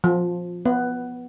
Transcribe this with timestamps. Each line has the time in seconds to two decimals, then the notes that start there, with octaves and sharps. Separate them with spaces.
0.04 F3
0.66 B3